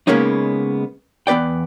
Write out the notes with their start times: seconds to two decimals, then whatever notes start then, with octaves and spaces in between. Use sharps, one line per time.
0.07 C#3 G#3 A#3 B3 C#4 D#4
1.27 E2 B3 B4 D5 G5